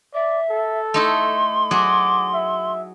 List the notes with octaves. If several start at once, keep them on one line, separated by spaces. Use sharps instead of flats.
D5 E5
A4
A3 D#4 E4 C6
F#3 F#4 G#4 D6
E5